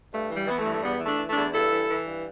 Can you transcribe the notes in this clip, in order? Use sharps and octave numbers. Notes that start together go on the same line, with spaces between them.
G2 A3
E3
G3
E3 B3
A3
G2
A3
E2 G3 B3
E3
A3 D4
E3
A3 D4
E2
G2 E4 A4
E3
E3
G2